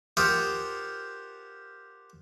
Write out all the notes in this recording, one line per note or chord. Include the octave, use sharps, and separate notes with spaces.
F4 G4 A#4 C5 F#5 D#6